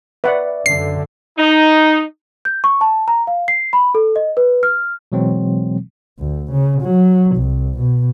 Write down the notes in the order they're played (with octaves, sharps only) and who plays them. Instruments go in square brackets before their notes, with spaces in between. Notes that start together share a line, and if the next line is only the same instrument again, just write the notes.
[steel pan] B4 F#5 [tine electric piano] D5 E5
[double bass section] F#2 D3 [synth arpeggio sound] C7
[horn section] D#4
[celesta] G6
C#6
A5
A#5
F5
C7
B5
A4
D#5
B4
F6
[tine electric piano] B2 E3 F#3 G#3 C4
[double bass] D2
C#3
F#3
C2
B2